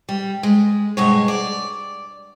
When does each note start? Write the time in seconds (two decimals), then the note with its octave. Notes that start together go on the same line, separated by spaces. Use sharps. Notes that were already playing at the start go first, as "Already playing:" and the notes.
0.09 G3
0.43 G#3
0.97 G2 B2 G#3 G#4 C#5
1.28 D5